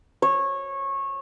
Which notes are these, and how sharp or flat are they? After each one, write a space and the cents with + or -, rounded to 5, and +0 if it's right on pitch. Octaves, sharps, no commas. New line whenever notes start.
C#5 -20